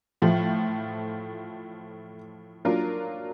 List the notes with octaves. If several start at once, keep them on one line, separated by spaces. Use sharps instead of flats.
A2 F3 A3
F#3 A#3 D4 F4 A#4